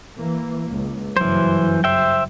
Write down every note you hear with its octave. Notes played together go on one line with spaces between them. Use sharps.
E3 A#3
C#2
F#1 G2 E3 F#3 C5
C5 E5 G5